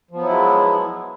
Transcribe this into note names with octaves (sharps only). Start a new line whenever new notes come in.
F3 F#3 G#3 B3 E4